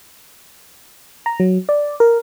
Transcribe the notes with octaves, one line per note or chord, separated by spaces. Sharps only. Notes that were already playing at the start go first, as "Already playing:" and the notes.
A#5
F#3
D5
A#4